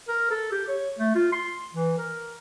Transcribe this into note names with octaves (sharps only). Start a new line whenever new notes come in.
A#4
A4
G4
C#5
A3
F4
C6
E3
A#4